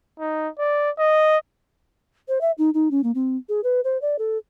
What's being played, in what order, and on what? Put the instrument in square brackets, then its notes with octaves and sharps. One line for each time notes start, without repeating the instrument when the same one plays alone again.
[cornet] D#4
D5
D#5
[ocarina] C5
E5
D#4
D#4
C#4
A#3
C4
G#4
B4
C5
D5
A4